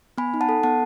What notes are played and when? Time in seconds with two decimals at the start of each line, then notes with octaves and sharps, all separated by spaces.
0.18 B3 G#5 B5
0.34 D#4
0.41 F#5 A5
0.49 A4
0.63 B3 F#5 A5